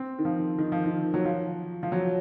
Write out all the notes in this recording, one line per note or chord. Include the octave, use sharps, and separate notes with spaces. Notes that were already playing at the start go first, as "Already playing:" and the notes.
Already playing: C4
D#3
F3
D#3
F3
D#3
F#3
F3
F3
F#3